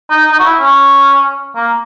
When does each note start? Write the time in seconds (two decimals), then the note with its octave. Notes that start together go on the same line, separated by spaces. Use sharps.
0.10 D#4
0.31 D#4
0.39 F#4
0.45 E4
0.59 C#4
1.55 A#3